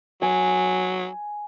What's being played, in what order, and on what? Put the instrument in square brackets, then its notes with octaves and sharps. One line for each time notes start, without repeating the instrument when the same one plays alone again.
[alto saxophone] F#3 [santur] G#5